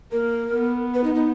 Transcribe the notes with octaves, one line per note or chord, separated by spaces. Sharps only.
A#3 A#4
B3
B4
D#4
D#4